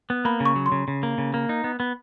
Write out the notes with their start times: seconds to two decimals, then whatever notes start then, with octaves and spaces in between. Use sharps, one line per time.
0.10 B3
0.25 A#3 B5
0.40 C#3
0.45 C#6
0.56 F#3
0.66 C6
0.72 C#3
0.88 C#3
1.03 A#3
1.18 C#3
1.34 A#3
1.49 D#4
1.64 B3
1.80 B3